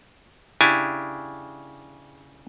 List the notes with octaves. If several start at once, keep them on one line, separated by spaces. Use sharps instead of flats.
C#3 D4 E4 G4 G#5